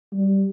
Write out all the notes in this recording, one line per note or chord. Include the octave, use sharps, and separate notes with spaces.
G3